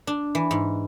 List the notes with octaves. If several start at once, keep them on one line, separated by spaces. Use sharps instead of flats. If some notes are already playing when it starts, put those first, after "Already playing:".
D4
E3
G#2